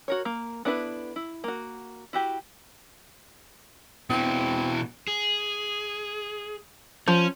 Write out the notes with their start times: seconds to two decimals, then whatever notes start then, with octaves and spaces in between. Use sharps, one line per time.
0.08 F#4 A#4 C#5
0.25 A#3
0.65 B3 D4 E4 A4 B4
1.16 E4
1.44 A#3 F#4
2.13 E4 F#4 G4
4.10 B2 E3 C4
5.08 G#4
7.08 F3 C#4